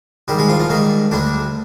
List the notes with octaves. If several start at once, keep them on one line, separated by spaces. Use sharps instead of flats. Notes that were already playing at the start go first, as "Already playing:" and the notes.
G#2 D#3 G3 G4
G#3 G#4
F3 F4
F3 F4
G#2 D#3 G3 D#4
D2 D3 G3 D4